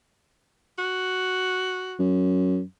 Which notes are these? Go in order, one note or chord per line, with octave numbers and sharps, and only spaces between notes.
F#4
F#2